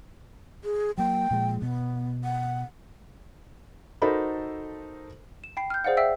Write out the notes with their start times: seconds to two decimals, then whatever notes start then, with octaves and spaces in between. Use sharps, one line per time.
0.64 G#4
0.98 F#3 A#3 G5
1.31 A#2 F3 G#3
1.62 B2 B3
2.24 F#5
4.02 D#4 F#4 A4 A#4 C5 B5
5.44 E7
5.57 G5 B5 C7
5.70 F6 G6
5.84 G#4 C5 D5 F5 F#5
5.97 E5 G5 E6 C7